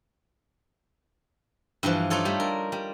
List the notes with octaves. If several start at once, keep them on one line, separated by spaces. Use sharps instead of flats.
G2 E3 F3
D4 D#4 F4 A4 C#5
G3 A3
A#4
G3